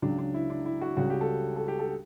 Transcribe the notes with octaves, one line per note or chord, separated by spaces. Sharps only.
C#2 C#3 F#3 D4
D4
E4
D4
E4
F#4
C#2 C#3 G3 F#4
G4
A4
A4
G4
A4